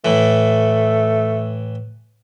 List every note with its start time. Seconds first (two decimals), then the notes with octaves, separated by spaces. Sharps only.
0.05 A2 E3 A3